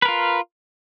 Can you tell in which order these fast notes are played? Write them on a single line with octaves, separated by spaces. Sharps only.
B4 A#4 F4